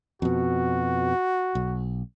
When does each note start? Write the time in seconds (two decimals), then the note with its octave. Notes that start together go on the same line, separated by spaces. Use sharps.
0.22 F2 B2 F#4
1.55 B1